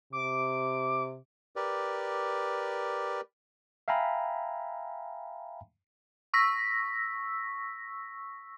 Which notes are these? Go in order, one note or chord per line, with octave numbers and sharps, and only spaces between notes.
C3 D6
G4 A#4 B4 D5
E5 F5 G5 G#5 A#5 B5
C#6 E6 A#6 B6